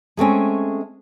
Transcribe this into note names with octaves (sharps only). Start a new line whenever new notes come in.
G#3 A3 C4 C#4